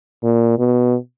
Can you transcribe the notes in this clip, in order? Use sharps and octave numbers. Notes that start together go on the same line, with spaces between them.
A#2
B2